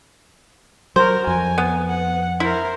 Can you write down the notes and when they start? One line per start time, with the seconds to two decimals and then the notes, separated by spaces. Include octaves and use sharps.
0.96 F#3 F#4 A#4 C5
1.27 F2 G#5
1.58 B3
1.89 F#5
2.40 E4 A#4 C5